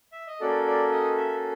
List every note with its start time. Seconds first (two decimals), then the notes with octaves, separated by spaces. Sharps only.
0.12 E5
0.27 D#5
0.40 A#3 C#4 F#4 A4 D5
0.66 D5
0.92 D#5
1.17 E5